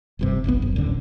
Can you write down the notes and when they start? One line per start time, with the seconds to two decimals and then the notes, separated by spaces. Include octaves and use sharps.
0.19 F1 G2 C3
0.44 F#1 B1 C3 B3
0.62 F#1 F#2
0.76 D#1 A1 D3